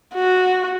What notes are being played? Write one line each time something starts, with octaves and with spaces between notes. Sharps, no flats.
F#4